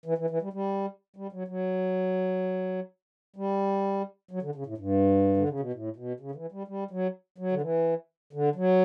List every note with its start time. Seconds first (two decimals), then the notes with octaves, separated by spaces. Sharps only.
0.06 E3
0.18 E3
0.30 E3
0.42 G3
0.53 G3
1.16 G3
1.32 F#3
1.48 F#3
3.36 G3
4.31 F#3
4.42 D3
4.55 C#3
4.66 A2
4.78 G2
5.37 D3
5.49 C#3
5.60 B2
5.73 A2
5.96 B2
6.20 C#3
6.31 D3
6.35 E3
6.52 G3
6.68 G3
6.91 F#3
7.38 F#3
7.52 D3
7.61 E3
8.33 D3
8.55 F#3